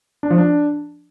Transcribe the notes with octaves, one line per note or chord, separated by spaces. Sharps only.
D4
F3
D4